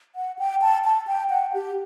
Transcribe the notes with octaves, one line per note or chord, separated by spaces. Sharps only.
F#5
G5
A5
A5
G5
F#5
G4